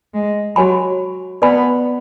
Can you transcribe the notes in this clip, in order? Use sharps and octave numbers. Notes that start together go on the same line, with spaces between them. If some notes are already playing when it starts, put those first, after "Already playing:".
G#3
F#3 F#4 C#5 G#5 B5
B3 B4 D5 G#5 B5